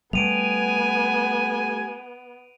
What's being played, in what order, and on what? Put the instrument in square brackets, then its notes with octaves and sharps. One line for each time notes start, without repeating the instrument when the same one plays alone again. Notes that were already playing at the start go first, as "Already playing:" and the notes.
[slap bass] G3 A3 [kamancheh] B3 [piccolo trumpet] G#5 [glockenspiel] D7 D#7 F7